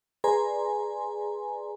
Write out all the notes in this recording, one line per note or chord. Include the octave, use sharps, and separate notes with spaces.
G#4 B4 D5 G#5 A#5 C6